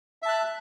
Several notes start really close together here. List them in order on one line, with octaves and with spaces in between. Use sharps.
E5 A5 F#6